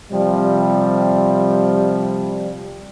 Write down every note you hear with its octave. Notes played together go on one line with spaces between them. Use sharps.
C3 F3 G3